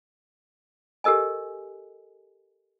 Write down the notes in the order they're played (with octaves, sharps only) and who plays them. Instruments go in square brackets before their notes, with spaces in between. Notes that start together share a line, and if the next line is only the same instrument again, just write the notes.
[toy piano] G4 A4 A#4 D#5 G#5